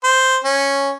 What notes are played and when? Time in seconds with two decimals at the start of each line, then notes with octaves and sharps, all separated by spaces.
0.04 C5
0.44 C#4